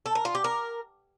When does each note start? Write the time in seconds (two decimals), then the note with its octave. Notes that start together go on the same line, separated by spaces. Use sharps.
0.06 A4
0.15 A#4
0.25 F4
0.35 G4
0.44 A#4